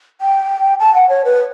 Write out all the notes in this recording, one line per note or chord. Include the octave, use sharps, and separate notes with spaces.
G5
A5
F#5
C#5
B4